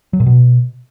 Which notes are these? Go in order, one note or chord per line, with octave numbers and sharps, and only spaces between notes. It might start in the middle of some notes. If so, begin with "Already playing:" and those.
F#3
A#2
B2